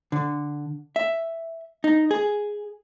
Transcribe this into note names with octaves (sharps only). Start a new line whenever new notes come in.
D3
E5
D#4
G#4